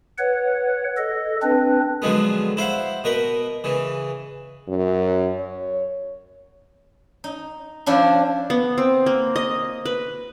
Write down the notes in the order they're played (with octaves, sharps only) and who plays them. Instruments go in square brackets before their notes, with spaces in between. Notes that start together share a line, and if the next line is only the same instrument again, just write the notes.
[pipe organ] B4 C#5 F#5
A4 D#5
C4 D4 B4
[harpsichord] D3 F3 F#3 G#3 B3
E4 C5 F5 F#5
B2 A#4 B4
C#3 E3
[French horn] F#2
C#5
[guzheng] D#4
F3 C#4 D4 E4
[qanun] B3
C4
A#3
D#5
B4